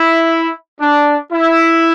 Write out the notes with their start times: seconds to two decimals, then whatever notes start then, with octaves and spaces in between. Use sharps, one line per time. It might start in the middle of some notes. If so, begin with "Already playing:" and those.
Already playing: E4
0.81 D4
1.33 E4